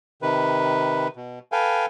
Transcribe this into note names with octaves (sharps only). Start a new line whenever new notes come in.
C3 D#3 B4
B2
A4 B4 F5 G5 G#5